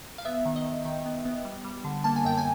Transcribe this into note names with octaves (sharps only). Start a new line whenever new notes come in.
F5
B3 E5
D#3
D#5
D#3
D#3 G5
B3
B3
G3
G3
D3
A#3 A5
G#5
F#2 G5
G#5